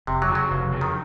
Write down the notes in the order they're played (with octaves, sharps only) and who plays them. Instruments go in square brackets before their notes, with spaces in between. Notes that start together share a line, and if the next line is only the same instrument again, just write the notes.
[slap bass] F1 [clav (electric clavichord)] C3
[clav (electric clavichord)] F#3
[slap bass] F2 C#3
[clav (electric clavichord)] F#3
[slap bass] F1
F2 C#3
[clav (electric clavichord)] D#3